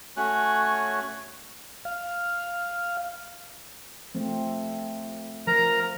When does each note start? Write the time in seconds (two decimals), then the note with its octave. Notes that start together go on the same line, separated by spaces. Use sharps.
0.17 A3 C#4 F#4 C#5 G#5 F#6
1.85 F5
4.15 F3 A3 C4
5.47 F3 A#4 A#5